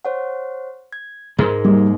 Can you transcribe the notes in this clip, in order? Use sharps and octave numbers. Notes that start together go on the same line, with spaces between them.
C5 C#5 F#5
G#6
G#2 G#3 G#4 A#4
G3 A#3 D#4 D6